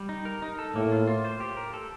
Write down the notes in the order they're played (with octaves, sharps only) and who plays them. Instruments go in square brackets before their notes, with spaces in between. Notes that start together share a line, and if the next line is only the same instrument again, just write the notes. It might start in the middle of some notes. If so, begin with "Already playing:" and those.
Already playing: [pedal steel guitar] G3
D#4
A#4
D#4
A4
[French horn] A2 [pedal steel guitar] A#3
[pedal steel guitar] F4
F4
C5
G4
A#4
A4